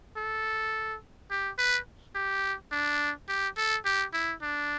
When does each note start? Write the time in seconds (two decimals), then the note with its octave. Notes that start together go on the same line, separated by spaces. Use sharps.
0.17 A4
1.30 G4
1.58 B4
2.15 G4
2.71 D4
3.29 G4
3.57 A4
3.85 G4
4.13 E4
4.43 D4